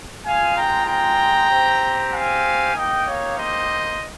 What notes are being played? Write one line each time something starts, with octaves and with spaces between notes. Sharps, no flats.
G#3 C4 F4 F5 G#5
G5 A#5
G5 A#5
C4 G4
F5 G#5
A#3 D#4 G4 D#5 G5
C#5 F5
C5 D#5